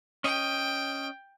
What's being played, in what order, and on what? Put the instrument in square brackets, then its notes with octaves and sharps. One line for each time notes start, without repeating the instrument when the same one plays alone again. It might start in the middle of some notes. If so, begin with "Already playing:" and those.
[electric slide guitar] C#4 D#5 [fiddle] G5